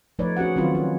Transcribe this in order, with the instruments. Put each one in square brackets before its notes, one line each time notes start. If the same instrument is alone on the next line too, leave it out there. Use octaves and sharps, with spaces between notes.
[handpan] F3 A3 D#4 B4 C#5 D5
C#4 F#4 G#4 F#5
D#3 F#3 C4 C#4 F4 B4
C#4